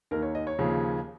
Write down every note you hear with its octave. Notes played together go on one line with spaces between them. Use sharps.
D#2 D#3 A#4
C#5
D#5
C#5
D#2 C#3 F3